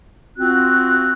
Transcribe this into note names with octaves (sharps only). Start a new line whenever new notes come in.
C4 F4 F#4 F#6